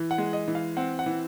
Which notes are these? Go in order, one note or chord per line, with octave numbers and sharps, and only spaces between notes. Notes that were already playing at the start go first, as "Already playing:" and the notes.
Already playing: E3
F#5
G#3
D#5
E3
F5
C4 F#5
F#5
E3